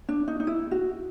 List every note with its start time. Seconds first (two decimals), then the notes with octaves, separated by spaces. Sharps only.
0.09 D4
0.28 D#4
0.40 D#4
0.47 E4
0.71 F#4